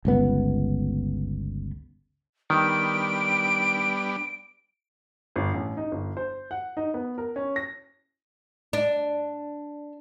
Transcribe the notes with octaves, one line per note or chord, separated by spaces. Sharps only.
G1 C#2 B3
D#3 G3 B3 D4 D7
G1
A1
D#4
G1
C5
F#5
D#4
B3
A#4
C#4
A#6
D4